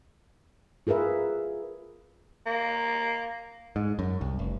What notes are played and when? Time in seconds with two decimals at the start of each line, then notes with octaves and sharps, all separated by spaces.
0.87 F4 G#4 A#4 B4 E5
2.46 A#3
3.76 G#2
3.99 F#2
4.21 C2
4.39 F1